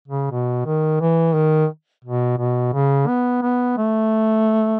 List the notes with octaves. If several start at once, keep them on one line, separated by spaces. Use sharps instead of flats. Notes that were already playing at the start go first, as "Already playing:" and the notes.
C#3
B2
D#3
E3
D#3
B2
B2
C#3
B3
B3
A3